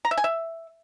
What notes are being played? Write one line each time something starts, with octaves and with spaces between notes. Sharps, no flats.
A#5
E5
G#5
E5